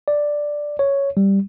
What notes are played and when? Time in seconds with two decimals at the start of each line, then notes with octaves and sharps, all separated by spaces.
0.08 D5
0.79 C#5
1.17 G3